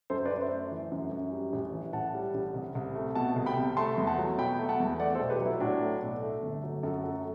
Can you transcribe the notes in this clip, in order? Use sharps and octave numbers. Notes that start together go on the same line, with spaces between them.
F#2 A4 C5
B4 D5
F#2
C5 E5
A3
E3
F#2
F#2
G3
A1
E3
A2 F#5 A5
G3
A1
C2
C2
A3
B2 F#5 A5
C2
G5 B5
C2
A3 A5 C6
E2
F#5 A5
F#3
B2 G5 B5
A3
F#5 A5
E2
A3 D5 F#5
A4 C5
B1
G4 B4
F#3 E4
A2 D4 F#4
A3
B1
A3
G1
F#3
F#2 F#4 A4
A3 F#4 A4